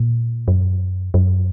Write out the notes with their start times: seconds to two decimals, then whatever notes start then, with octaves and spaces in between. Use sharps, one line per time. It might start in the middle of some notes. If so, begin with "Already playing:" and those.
Already playing: A#2
0.48 F#2
1.14 F#2